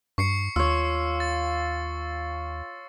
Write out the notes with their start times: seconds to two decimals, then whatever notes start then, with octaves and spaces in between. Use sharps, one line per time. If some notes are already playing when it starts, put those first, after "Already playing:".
0.18 G2 C#6 C7 C#7
0.56 D#2 F4 C#5 E6
1.20 A6